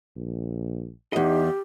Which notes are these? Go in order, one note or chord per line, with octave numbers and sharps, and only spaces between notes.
A#1
E2 D#4 G4 D#5